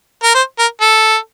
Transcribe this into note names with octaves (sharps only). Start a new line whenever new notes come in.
A#4
C5
A#4
A4